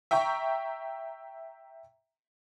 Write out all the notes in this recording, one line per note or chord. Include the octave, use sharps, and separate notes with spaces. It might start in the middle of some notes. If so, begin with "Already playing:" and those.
E5 G5 A#5 C#6